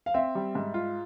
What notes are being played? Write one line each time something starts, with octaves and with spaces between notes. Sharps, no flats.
F5
C4 E5
G3
G#2
F4